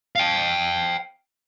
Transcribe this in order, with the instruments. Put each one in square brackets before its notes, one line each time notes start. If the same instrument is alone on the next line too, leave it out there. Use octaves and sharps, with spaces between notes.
[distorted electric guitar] F5 G5